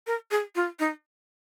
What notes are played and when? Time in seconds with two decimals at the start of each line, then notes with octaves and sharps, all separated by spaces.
0.07 A#4
0.31 G#4
0.55 F4
0.79 D#4